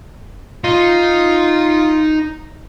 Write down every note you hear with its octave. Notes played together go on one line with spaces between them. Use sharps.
D#4 F4